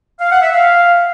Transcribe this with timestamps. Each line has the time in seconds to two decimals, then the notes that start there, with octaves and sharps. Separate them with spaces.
0.18 F5
0.30 F#5
0.41 E5
0.53 F5